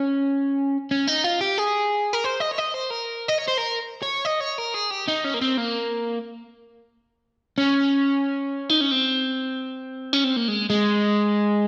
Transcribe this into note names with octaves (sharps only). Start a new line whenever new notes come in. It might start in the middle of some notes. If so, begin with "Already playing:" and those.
Already playing: C#4
C#4
D#4
F4
G4
G#4
A#4
C5
D#5
C#5
D#5
C5
A#4
D#5
C#5
C5
A#4
C#5
D#5
C#5
A#4
G#4
G4
D#4
C#4
A#3
C4
A#3
C#4
D#4
C#4
C4
C#4
C4
A#3
G#3
G#3